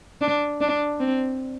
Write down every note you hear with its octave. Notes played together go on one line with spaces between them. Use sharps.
D4
D4
C4